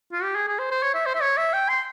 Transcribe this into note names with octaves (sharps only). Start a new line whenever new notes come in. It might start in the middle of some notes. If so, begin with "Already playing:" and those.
F4
G4
G#4
G#4
C5
C5
C#5
E5
C5
E5
C#5
E5
G5
C6